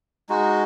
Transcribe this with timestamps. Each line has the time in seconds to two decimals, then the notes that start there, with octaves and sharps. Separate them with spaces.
0.29 G#3 D#4 F#4